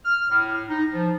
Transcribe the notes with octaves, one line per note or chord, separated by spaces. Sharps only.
F6
A2
D#4
F3